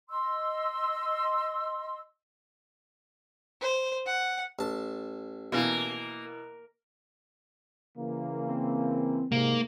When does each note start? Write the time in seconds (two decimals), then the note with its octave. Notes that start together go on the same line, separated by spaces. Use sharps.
0.09 D#5 C6 E6
3.61 C5
4.06 F#5
4.59 A1 A5
5.52 B2 E3 A#3
7.97 C#3 E3 A#3
8.49 C4
9.32 G#2 C3 A#3